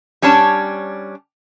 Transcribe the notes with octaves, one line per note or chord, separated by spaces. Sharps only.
G3 C#4 D4 C#5 A5